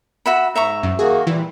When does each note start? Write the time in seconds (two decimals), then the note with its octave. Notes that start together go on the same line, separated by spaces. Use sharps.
0.26 F#4 E5 B5
0.56 G#2 E5 A#5 C#6
0.83 F#2
0.99 D#3 A#3 F#4 G#4
1.27 A#2 E3 G3